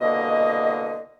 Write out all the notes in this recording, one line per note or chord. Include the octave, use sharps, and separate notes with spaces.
C2 B2 D3 A#3 D#5